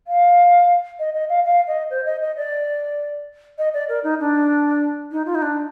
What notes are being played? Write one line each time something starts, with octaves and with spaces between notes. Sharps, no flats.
F5
D#5
D#5
F5
F5
D#5
C5
D#5
D#5
D5
D#5
D5
A#4
D#4
D4
D#4
F4
D#4
D4